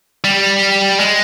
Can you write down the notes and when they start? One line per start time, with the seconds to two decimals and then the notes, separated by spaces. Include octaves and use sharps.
0.24 G3
0.99 G#3